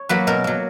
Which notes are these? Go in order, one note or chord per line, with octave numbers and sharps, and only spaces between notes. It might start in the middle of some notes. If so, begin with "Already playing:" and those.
Already playing: C#5
F#3 A#3 B4
B2 A#4
F#3 A#3